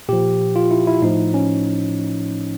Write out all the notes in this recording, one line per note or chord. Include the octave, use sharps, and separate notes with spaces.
A#2 F3 G4
F4
E4
E4
A2 F3 D#4
C#4